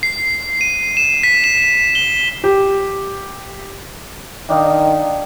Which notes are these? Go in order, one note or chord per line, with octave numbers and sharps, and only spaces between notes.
C7
D#7
E7
B6
E7
G7
G4
D#3 D4 D#4 F5